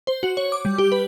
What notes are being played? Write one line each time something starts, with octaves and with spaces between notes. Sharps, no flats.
C5
F#4
C#5
D6
G3
G4
B4